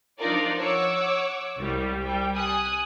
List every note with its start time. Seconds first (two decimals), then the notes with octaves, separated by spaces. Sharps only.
0.20 F3 D4 D#4 F4 A#4 D5
0.60 C#5 F#5 D6 E6
1.58 C2 G3
2.01 G3 G5
2.35 G#5 D#6 F#6